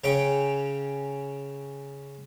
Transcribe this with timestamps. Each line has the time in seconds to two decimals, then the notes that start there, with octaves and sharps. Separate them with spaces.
0.04 C#3 C#4 G5